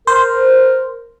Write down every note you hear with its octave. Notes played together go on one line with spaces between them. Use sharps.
A#4 C5